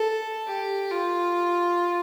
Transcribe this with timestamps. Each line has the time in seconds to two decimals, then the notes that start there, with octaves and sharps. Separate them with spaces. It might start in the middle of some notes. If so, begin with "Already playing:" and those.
Already playing: A4
0.47 G4
0.91 F4